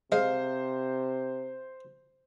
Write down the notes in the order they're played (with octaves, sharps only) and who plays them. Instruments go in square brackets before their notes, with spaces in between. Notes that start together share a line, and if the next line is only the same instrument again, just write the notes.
[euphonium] C3 [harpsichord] G#3 [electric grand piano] C5 [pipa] F5